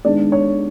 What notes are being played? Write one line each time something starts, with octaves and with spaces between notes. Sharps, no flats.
D#3 G#3 B3 D4 D5
C#5